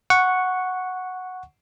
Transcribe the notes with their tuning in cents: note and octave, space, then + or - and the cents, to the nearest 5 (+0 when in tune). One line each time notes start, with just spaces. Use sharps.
F#5 -5 C#6 +0